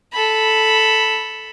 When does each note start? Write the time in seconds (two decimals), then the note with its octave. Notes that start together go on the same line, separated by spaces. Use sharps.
0.13 A4 B5